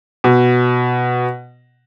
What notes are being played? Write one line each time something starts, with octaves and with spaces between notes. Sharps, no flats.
B2